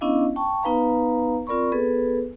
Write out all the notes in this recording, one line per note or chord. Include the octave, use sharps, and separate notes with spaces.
B3 C#4 D4 E4 D#5 F5
G5 A5 C#6
B3 D#4 B4 F5 A#5
C4 F4 A#4 D5 B5 C#6
B3 G#4 A4 B4